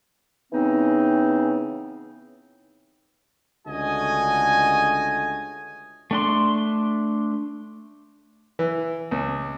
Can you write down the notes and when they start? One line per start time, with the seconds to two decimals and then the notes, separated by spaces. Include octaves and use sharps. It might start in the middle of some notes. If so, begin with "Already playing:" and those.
0.52 C#3 E3 B3 C4 D#4
3.66 C#2 D3 A3 F#4 D#5 G#5
6.11 A3 D4 C6
8.59 E3
9.11 C#2